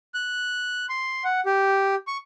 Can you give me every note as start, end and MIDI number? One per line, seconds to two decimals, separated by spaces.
0.14 0.86 90
0.89 1.24 84
1.24 1.40 78
1.46 1.95 67
2.07 2.17 85